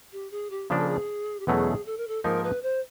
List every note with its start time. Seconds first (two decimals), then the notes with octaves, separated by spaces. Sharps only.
0.12 G4
0.31 G#4
0.50 G4
0.70 C#3 F3 A#3 D4 G#4
0.79 A4
0.88 G#4
1.40 G4
1.47 E2 B2 F#3 A3 C#4 G#4
1.86 A4
1.98 A#4
2.08 A4
2.24 G#2 F3 A#3 D#4 A#4
2.44 B4
2.63 C5